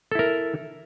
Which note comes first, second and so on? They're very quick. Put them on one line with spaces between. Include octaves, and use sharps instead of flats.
A4 E4 A#4